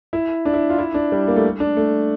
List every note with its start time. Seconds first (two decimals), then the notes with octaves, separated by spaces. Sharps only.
0.13 E4
0.45 D4
0.54 E4
0.70 F4
0.78 E4
0.94 D4
1.12 G3
1.28 A#3
1.36 A3
1.60 D4
1.77 A3